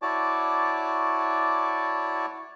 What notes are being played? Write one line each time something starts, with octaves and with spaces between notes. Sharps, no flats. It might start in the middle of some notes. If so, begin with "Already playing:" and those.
E4 F#4 C#5 D5 A5 D6